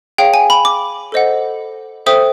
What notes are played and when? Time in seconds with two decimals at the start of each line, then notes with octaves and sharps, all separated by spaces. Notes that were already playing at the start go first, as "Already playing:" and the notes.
0.18 G#4 C#5 F5 G5
0.34 G#5
0.50 B5
0.65 D6
1.12 A4 C5 D#5 F#5
2.06 A4 C5 E5 G5 D#6